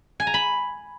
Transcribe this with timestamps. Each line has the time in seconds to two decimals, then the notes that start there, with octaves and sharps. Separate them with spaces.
0.20 G#5
0.27 A#5
0.34 B5